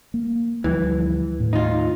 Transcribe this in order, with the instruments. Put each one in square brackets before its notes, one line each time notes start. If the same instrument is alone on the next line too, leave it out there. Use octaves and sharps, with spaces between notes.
[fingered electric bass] A#3
[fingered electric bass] D2 F3 G3 [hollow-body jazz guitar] E3
[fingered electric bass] D#2 A2
[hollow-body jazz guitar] D#4 F4